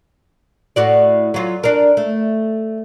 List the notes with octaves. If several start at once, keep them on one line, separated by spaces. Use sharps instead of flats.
A2 F#4 D5
F#3 F4
D4 A#4
A3